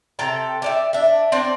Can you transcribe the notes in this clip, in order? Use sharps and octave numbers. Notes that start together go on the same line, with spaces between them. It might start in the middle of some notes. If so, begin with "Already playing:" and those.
C3 A4 G5 A#5
G4 D5 E5
D4 E5
C4 D4 D5